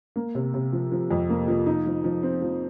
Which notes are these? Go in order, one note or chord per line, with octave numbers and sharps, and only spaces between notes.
A#3
C3
C3
F3
F3
F2
A#3
F3
D#4
F3
F3
C4
F3